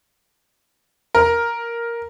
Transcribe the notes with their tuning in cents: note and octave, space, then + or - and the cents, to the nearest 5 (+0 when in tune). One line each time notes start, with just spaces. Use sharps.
A#4 +5